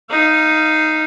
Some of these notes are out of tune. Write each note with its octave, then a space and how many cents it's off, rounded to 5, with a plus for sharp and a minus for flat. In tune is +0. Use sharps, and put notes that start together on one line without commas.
D#4 +0 F5 -15